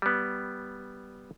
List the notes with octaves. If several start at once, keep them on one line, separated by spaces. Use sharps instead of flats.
G3 B3